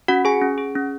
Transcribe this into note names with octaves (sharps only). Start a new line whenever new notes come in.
C#4 F#4 F#5
G#4 G#5
C#4
G#4
C#4